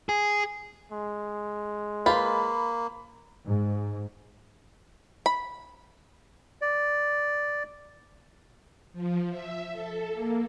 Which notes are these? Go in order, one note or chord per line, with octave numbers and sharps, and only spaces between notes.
G#4
G#3
A#3 F4 B4 C5 B5
G#2
B5
D5
F3
E5
A4
A#3